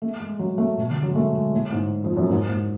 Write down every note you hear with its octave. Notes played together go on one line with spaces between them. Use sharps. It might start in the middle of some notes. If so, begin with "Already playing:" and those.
A3
G#3
F#3
A3
B2
D3
F#3
G#3
A3
G#3
A2
G#2
F2
F#2
G#2
G#2